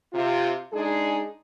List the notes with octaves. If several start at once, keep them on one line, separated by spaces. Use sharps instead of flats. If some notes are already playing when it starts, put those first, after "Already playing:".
C3 F4
G#3 D4 D#4 G#4